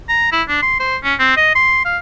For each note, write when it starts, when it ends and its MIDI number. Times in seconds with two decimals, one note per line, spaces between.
0.09 0.31 82
0.32 0.42 64
0.48 0.58 62
0.63 0.78 84
0.80 0.97 72
1.04 1.14 61
1.20 1.33 60
1.37 1.52 75
1.55 1.82 84
1.85 1.97 77